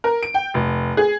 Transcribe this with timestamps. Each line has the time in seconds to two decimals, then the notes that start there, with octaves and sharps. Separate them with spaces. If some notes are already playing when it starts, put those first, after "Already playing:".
0.04 A#4
0.23 D7
0.34 G5
0.54 F1
0.97 G#4